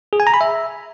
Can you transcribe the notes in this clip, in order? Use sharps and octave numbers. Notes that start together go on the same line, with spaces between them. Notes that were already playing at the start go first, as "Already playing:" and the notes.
G#4
G#5
A#5
B5
E5